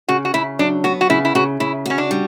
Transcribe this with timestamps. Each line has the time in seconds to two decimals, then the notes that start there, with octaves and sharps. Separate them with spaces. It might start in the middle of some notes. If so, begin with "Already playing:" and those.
0.08 C#3 F#4
0.25 F#4
0.34 C#3 E4
0.59 F#3 D4
0.84 B3 F#4
1.01 F#4
1.10 C#3 E4
1.25 E4
1.35 C#3 F#4
1.60 C#3 E4
1.86 C#4 F#4
1.98 D4
2.11 G3